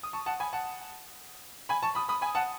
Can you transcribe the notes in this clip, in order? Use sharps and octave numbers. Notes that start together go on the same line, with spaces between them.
D#6
A5 C#6
F#5 A5
G#5 B5
F#5 A5
G#5 B5
A5 C#6
B5 D#6
B5 D#6
G#5 B5
F#5 A5